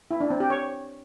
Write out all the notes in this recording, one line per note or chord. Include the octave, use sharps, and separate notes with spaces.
E4
D4
C4
G4
C#5